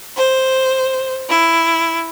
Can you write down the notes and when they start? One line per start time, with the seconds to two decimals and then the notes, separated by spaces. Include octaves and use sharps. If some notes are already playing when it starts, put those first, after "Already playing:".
0.17 C5
1.30 E4